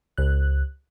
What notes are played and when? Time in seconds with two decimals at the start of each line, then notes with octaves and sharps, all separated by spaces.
0.18 C#2 F#6